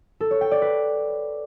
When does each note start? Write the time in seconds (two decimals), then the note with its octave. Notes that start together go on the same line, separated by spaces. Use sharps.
0.20 A4
0.31 C#5
0.41 G5
0.51 D5
0.62 B4